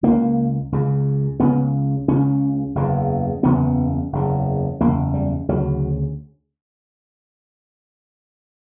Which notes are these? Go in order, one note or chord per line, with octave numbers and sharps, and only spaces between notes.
C#2 C#3 A#3
C#2 C#3
C#2 C#3 B3
C#2 C#3 C#4
F#1 E2 C#3
F#1 E2 C#3 B3
F#1 E2 C#3
F#1 E2 C#3 A#3
G3
D2 C#3 F#3